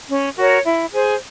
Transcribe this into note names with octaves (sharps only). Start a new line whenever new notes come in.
C#4
F#4 A#4 C#5
E4
G#4 C5